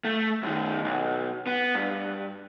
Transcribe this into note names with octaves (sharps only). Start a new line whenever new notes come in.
A3
F#2 D#3
B1
B3
G2